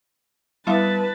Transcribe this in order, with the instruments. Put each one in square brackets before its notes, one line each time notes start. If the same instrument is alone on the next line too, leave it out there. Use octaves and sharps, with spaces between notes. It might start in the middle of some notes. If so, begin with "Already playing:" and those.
[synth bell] G3 B3 [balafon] E4 E5 F5 [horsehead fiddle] B4 A5